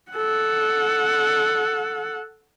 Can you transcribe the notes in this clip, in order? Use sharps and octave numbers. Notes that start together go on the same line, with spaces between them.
A4 F#5